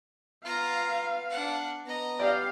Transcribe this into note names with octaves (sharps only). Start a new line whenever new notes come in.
B3 F4 F5 A#5
D4 F#5
B3 D#5 A#5
G4 D5 F5